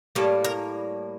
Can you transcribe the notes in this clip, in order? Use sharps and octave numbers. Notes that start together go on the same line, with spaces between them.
A2 G3 A#3 A4
A#4